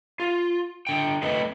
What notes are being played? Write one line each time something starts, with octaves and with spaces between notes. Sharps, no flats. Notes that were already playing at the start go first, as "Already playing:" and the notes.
F4
D3 G5
A3 C4 B4 D#5 E5